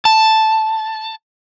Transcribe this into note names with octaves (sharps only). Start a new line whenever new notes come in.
A5